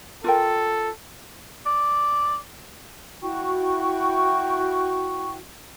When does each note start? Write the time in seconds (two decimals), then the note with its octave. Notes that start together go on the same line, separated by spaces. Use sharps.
0.24 F4 A4 A#4 G5
1.66 D5
3.22 E4 F#4 G5 C#6